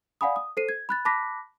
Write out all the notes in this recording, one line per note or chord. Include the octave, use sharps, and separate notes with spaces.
D5 F5 F#5 G#5 B5 D#6
D#6
A4 C5 C7 D#7
G#6
B5 F#6 A6
A5 B5 D6 F#6 A#6 B6